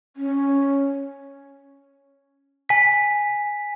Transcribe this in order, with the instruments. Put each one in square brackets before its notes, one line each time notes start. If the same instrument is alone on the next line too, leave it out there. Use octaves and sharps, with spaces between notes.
[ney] C#4
[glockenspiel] G#5 B6